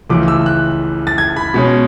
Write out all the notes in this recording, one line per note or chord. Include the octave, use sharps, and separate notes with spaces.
C#2 C#3 E3 A3 D6
E6
F#6
A6
G#6
B5
B2 G#3 C#4